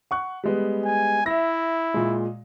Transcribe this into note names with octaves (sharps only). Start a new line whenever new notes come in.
F#5 C#6 F#6
G3 G#3 B3
G#5
E4 E5 A#6
A#2 G#3